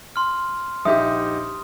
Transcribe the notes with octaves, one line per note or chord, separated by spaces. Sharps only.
C6 F6
A#1 D#4 G4 E5 D#6